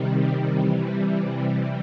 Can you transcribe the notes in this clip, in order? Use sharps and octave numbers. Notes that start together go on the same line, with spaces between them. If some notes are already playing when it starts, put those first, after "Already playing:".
Already playing: C3 D#3 G3
C3 E3 G3